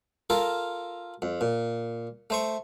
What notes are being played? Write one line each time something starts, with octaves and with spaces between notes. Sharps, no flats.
F4 A4 A#4
F2
A#2
A3 C5 C#6